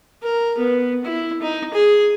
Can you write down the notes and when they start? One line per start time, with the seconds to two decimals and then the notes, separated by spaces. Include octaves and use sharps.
0.22 A#4
0.58 B3
1.05 E4
1.42 D#4
1.74 G#4